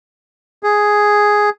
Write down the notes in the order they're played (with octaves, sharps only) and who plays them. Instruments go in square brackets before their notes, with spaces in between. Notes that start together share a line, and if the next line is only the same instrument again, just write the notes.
[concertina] G#4